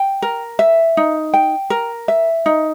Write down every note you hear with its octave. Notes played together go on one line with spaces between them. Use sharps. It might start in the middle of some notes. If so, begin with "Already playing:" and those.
Already playing: G5
A#4
E5
D#4
G5
A#4
E5
D#4